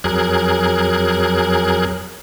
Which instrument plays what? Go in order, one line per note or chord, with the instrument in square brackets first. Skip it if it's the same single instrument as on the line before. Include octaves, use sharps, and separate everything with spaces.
[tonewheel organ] F2 F#3 G#4 A#4 F#6 G#6